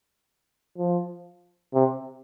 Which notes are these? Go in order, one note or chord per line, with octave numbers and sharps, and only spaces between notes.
F3
C3